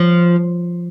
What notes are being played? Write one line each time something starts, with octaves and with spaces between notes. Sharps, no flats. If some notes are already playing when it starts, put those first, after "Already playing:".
Already playing: F3